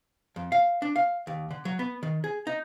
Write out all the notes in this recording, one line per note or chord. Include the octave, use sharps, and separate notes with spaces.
F2
F5
D4
F5
D#2
D3
F#3
B3
D#3
G#4
D#4